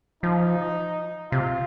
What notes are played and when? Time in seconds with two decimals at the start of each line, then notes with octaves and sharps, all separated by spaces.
0.23 F3 D#4
1.31 C3 F4